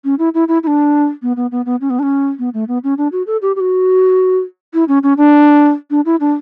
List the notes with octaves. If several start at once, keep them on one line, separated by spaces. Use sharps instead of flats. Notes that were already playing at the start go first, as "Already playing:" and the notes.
C#4
E4
E4
E4
E4
D4
B3
B3
B3
B3
C#4
B3
D4
C#4
B3
A3
B3
C#4
D4
F#4
A4
G4
G4
F#4
E4
C#4
C#4
D4
D4
E4
D4